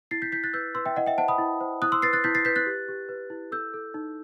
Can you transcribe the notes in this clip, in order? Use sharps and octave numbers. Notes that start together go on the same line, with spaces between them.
E4 A6 C7
G6 B6
E4 G6 B6
F#6 A6
B4 E6 G6
B4 C6 E6
E5 G5
E4 D#5 F#5
E5 G5
C5 F#5 A5
B5 D#6
E4
C5
E4 D#6 F#6
C6 E6
B4 A6 C7
F#6 A6
E4 G6 B6
A6 C7
B4 G6 B6
F#6 A6
G4
G4
B4
E4
A4 E6 G6
A4
D#4